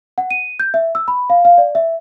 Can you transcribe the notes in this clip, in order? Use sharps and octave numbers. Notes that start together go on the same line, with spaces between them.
F#5
D#7
G6
E5
E6
B5
F5
F5
D5
E5